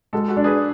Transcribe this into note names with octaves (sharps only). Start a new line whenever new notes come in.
G#3 F#4 A4
F#4 A4
D4
G#4 B4